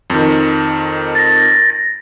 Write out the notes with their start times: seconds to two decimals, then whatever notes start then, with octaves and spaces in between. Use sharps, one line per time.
0.10 F2 D#3
1.15 A6 A#6